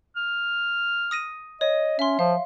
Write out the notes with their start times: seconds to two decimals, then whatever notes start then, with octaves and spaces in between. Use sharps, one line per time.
0.16 F6
1.11 D#6 A#6 D#7
1.61 C#5 D#5
1.99 C#4 E5 C6
2.19 F3 F5